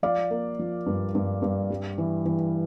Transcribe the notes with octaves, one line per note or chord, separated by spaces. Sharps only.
F3 D5 F5
A#3
F3
G2
G2
G2
G3
E3
E3